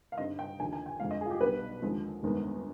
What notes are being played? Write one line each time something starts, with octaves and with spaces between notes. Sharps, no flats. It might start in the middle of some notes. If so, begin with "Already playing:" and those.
F5
G2 D3 G3 C4 D#4 D#5
G5
D#2 D3 F3 G#5
G#5
G5
F2 D3 F3 G#3 F5
D#5
G#4
F4
G4
B1 B2 G3 D4 B4
D#2 D3 F3 G#3 C4
G1 F2 D#3 G#3 B3